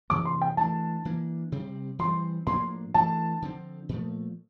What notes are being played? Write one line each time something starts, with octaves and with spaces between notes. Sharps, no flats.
C3 E3 A#3 D6
C6
G5
E3 A3 D4 A5
E3 A#3 D4
C3 G3 C4
E3 G3 C4 C6
A2 F3 A#3 D4 C6
E3 A3 D4 A5
D3 F3 C4
A#2 F3 A3